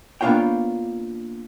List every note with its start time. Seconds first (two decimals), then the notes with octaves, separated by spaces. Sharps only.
0.21 A#3 B3 D4 F4 C#5 G5